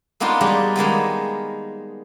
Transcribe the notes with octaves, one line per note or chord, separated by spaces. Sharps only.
A#3 B3 D4 D#4 F4
G3 G#3 D#4 F4 D5 D#5
D#3 G#3 A#3 B3